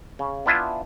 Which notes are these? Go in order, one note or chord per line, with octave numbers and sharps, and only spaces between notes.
C#3
B3 D4 E4 F4 E5 G#5